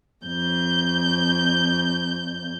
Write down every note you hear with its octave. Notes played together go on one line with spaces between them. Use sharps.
F2 G6